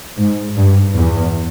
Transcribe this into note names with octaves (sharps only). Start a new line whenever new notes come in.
G#2
G2
E2